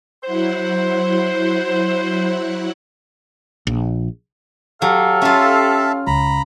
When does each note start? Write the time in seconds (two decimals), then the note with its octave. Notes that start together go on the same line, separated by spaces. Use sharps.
0.24 F#3 E4 C5 F#5
3.67 A#1
4.82 F#3 G4 A4 F5
5.22 C#4 F4 E5 A5
6.07 C#2 A#5 B5